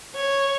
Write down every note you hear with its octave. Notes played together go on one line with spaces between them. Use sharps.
C#5